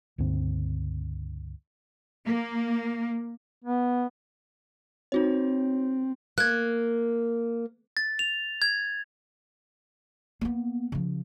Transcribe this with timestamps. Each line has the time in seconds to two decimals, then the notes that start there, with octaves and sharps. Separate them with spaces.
0.18 C#2 G2 D3 C4
2.26 A#3
3.64 B3
5.12 C4 D#4 F#4 C#5
6.38 A#3 F#6 G#6
7.97 A6
8.19 F7
8.62 G#6
10.41 A#3 B3
10.92 C#3 F3